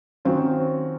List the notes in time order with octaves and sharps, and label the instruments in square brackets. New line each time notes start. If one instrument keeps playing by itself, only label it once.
[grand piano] D#3 F#3 C#4 F4 [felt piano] C4